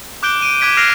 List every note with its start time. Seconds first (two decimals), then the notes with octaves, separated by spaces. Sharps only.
0.23 D6 F#6 G6 D7 G7
0.42 D7 D#7
0.61 D6 F#6 G#6 B6 D7
0.77 F6 F#6 A#6 C7 D7 F7